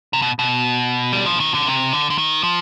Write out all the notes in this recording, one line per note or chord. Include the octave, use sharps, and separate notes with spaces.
C3
B2
B2
G3
F3
D#3
D3
C3
D3
D3
D#3
F3